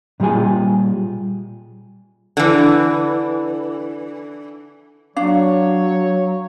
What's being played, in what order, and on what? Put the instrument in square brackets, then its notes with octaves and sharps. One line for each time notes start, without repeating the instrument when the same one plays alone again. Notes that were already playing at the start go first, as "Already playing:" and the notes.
[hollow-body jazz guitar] A#2 G3 F4 G#4 G#5
[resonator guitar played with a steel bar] D3 E3
[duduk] F#3 [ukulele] D4 [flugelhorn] C#5 [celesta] F5